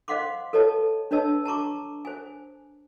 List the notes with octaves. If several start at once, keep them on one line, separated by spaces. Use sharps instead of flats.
C5 D#5 F5 F#5 C6 D6
A4 B4 C#5 D#5 A5
D4 B4 C#5 D#5 A5 E6
A5 A#5 C#6 D6
C5 G#5